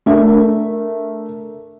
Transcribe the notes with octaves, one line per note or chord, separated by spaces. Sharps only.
A3 D4 A#4 E5